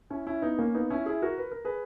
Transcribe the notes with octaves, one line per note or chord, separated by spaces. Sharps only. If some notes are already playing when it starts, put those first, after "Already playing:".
C#4 E4
C#4 E4
B3 D#4
A#3 C#4
B3 D#4
C#4 E4
E4 G#4
F#4 A#4
B4
A#4
G#4 B4